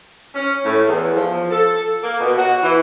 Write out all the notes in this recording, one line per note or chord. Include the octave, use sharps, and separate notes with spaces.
C#4
A2
E2
F3
A4
A#3
B2
F#4
E3